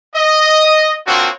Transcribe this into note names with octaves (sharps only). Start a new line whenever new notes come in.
D#5
A#3 C4 D4 F4 F#4 C#5